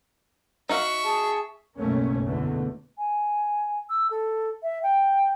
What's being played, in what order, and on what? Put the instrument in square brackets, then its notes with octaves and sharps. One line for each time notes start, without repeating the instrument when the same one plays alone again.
[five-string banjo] D#4 F#4 F5 [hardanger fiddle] E5 C#6
[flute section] G#4 A5
[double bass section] F#1 B1 A3 A#3 C#4
E2 B2 D3 E3 A3
[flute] G#5
E6
A4
E5
G5